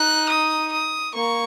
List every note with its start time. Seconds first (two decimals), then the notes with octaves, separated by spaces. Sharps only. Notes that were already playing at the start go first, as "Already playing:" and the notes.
Already playing: D#4 F#6
0.29 D#6
0.72 D#6
1.14 A#3 C#6